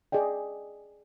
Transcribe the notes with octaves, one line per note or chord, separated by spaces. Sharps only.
G#4 D5 D#5 G5